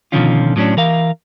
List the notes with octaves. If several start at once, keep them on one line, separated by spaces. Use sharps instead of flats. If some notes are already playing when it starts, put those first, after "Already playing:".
B2 D3 D#3 F3 C#4 F4
A2 F#3 A#3 C#4 D4
E3 A#4 F5